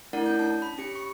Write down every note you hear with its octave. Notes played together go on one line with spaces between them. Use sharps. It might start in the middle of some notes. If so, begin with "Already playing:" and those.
A3 D4 E4 A#4 D5 F#5
C#4 G6
D4 A5
B5
C#4 G4 C#7
C#6